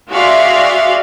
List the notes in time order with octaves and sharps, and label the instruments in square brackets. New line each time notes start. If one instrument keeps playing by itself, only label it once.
[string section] F#4 G#4 D5 E5 F5 C6